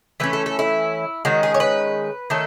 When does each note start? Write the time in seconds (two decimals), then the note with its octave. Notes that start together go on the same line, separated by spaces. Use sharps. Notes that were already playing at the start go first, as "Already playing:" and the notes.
0.20 E3 A3 C#4 B4
0.33 A4
0.46 A4
0.59 E4
1.25 D#3 G#3 C#4 F#4
1.43 G#4
1.54 C#5
1.60 B4
2.30 D#3 A3 C#4 A4